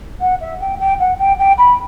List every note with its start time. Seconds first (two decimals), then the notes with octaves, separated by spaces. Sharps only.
0.20 F#5
0.40 E5
0.60 G5
0.80 G5
0.99 F#5
1.19 G5
1.38 G5
1.58 B5